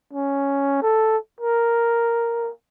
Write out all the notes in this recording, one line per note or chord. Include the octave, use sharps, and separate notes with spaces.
C#4
A4
A#4